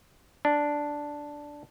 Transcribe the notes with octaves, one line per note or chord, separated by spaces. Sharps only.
D4